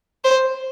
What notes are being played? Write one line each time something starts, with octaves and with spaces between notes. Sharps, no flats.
C5